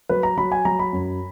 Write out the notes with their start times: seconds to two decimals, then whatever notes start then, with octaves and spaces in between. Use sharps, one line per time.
0.09 F#3 B4
0.23 A#5
0.37 F#3 B5
0.52 G#5
0.65 F#3 A#5
0.79 B5
0.93 F#2